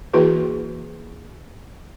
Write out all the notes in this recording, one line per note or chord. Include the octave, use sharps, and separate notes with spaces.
E3 A#3 E4 F#4 G#4 B4